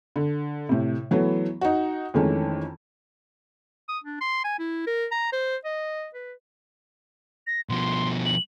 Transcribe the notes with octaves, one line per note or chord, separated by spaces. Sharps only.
D3
A2 C3
E3 F#3 A3 B3
D#4 F#4
F2 D#3 E3 G#3 A3 C#4
D#6
D4
C6
G#5
E4
A#4
A#5
C5
D#5
B4
A#6
B2 F3 C6
F#7